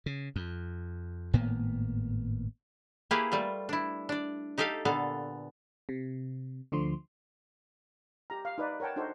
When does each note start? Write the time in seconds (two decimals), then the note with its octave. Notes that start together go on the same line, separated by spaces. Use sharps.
0.06 C#3
0.36 F2
1.33 G#1 A2 A#3 B3
3.11 A#3 E4 G4 G#4 B4 F5
3.32 G3 A3 F4
3.69 D4 E4
4.09 D4 D5
4.58 D#4 G4 A4 E5 F5
4.85 A#2 D3 B3 A4 F5
5.89 C3
6.72 D2 D3 F3 C6
8.30 G4 A#5
8.45 F5
8.58 D#4 B4 D5
8.80 A#4 C#5 F#5 G5 A5
8.96 D4 D#4 F#4 A4 C5